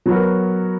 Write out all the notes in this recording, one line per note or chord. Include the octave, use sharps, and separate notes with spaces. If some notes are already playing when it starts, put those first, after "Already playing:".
F#3 B3 F#4 A#4